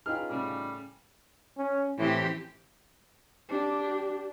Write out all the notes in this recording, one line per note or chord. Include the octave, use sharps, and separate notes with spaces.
C#4 D#4 F4 G#4 B4 G5 F6
A2 C#3 G3
C#4
A2 E3 C4 G4
D4 G4